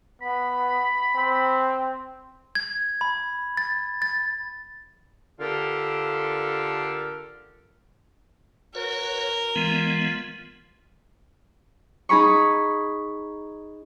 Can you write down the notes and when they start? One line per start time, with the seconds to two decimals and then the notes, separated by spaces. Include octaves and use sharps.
0.22 B3 B5
1.16 C4
2.55 G#6
3.01 B5
3.57 A6
4.02 A6
5.40 D3 F4 G4 A4 A#4
8.75 F#4 A#4 B4 C#5
9.56 E3 G#3 B3 F4
12.09 D#4 G#4 B5 C#6